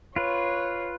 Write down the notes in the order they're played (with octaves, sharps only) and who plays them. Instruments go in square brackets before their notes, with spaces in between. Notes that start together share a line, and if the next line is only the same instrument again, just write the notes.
[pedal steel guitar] F4 B4 [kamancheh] C#5